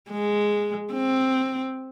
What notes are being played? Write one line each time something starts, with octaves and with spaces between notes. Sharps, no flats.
G#3
C4